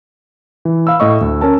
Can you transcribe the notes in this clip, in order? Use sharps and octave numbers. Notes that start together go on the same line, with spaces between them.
E3
F5 B5 E6
A2 D#5 C#6
D2
C#4 A#4 A5